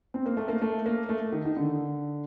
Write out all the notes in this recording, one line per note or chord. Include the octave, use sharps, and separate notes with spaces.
C4
A#3
A3
A#3
A3
A#3
A3
D#3
D#3
D3